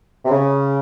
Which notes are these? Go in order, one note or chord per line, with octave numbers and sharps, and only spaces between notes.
C3
C#3